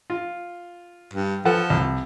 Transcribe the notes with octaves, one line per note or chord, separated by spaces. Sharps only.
F4
G2
F3 A4 B4 F#5
C2